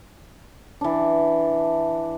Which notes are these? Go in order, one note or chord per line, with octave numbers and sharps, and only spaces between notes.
E3 D4